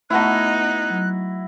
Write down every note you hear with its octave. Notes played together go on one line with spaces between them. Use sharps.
A3 B3 D#4 E4 F#4 F#5 A5 F#6
F#3